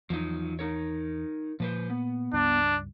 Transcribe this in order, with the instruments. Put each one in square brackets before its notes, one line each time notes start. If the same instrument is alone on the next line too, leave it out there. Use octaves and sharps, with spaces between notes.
[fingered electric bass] E2 [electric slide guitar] F3 F#3 D#4
[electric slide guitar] D#4 A#4 C#5
[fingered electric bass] A#2 [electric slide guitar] F3 B4 C5
[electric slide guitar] B3
[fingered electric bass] C#2 G2 [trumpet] D4